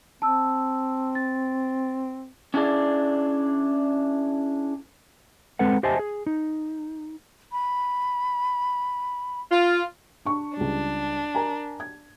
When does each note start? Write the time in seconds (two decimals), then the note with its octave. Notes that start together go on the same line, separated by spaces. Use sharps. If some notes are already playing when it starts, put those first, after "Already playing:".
0.22 C4 A5 E6
1.15 A6
2.54 C#4 D4 E4 G4 G#4 D5
5.59 G#3 C4 A4 B4 F#5
5.83 G4 C5 D#5 E5 G#5 A5
5.99 G#4
6.26 D#4
7.52 B5
9.51 F4
10.25 D4 C#6
10.57 C#2 G3 D4
11.35 A#4 G#5 A#5
11.80 G#6